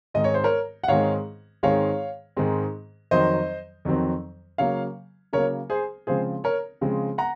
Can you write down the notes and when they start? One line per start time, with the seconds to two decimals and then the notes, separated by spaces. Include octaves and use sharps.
0.14 G#2 D#3 G#3 C4 D#5
0.24 C#5
0.34 C5
0.44 A#4 C#5
0.84 F#5
0.88 G#2 D#3 G#3 C4 C#5 F5
1.63 G#2 D#3 G#3 C4 C#5 F5
2.37 G#2 D#3 G#3 C4
3.11 F2 D#3 F#3 C4 C5 D#5
3.85 F2 D#3 F#3 C4
4.58 C#3 F#3 A#3 C#5 F5
5.33 C#3 F#3 A#3 A#4 C#5
5.70 G#4 C5
6.07 C#3 F3 G#3 C4 G#4 C5
6.44 A#4 C#5
6.81 C#3 F3 G#3 C4
7.18 F#5 A#5